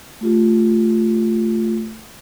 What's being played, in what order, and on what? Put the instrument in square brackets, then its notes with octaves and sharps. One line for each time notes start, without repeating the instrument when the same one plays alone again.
[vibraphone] A3 F4 G4